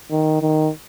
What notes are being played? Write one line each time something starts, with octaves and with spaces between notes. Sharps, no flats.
D#3
D#3